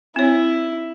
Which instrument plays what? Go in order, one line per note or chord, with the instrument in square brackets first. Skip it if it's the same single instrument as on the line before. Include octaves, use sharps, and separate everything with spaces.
[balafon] C4 C#5 [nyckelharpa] E4